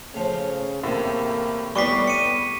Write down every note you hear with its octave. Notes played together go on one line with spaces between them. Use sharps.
A2 C#3 F3
E2 A2 C3 A#3
A2 G3 B3 C#6 D6 B6 C7
C#7 D#7